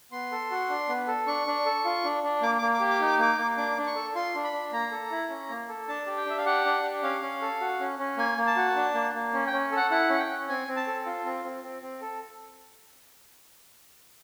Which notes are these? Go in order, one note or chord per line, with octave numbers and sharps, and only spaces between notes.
B3 C6
A4
F#4
D4
B3
A4
D4 C#6
D4
A4
F4
D4
D4
A#3 D6
A#3 D6
D6
G4
D6
D#4
D6
A#3 D6
A#3
D4 D6
D4
C#6
A4
F4 C6
D4
B5
D4
A#3 A#5
A4
E4
C#4
A#3
A4
D4 A5
G4
G5
D4 E5
F5
G4 F#5
D4
G4
C#4 F5
C#4
A4
F#4
C#4
C#4
A#3 G#5
A#3
A5
F#4
D4
A#3
A#3
C#4
G5
C#4
A4
F#5
E4 F#5
C#4 F#5
G5
C#4
C4 G#5
C4
A5
A4
F4
C4
C4
C4
C4
A4